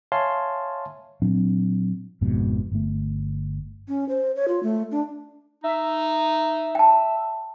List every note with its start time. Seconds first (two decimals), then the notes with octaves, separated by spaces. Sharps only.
0.12 C#5 E5 F5 G#5 A5 C6
1.22 A#2 F#3 C4 D4
2.21 G#1 F2 G#2 B2
2.72 G1 A3
3.88 C#4
4.09 C5
4.36 C#5
4.48 F4
4.63 A3
4.91 D4
5.64 D#4 E5
6.75 G5 A5